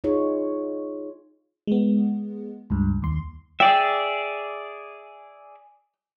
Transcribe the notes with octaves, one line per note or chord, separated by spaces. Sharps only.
D#4 F4 G#4 C#5
G#3 B3
C#2 G2
D#2 C6
G#4 D5 E5 G5